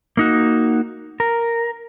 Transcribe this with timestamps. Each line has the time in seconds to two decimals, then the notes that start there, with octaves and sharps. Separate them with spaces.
0.17 A#3 D#4 F#4
1.20 A#4